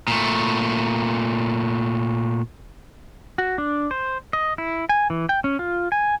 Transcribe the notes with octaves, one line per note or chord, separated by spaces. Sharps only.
A#2 A3
F#4
D4
C5
D#5
E4
G#5
E3
G5
C#4
F4
G#5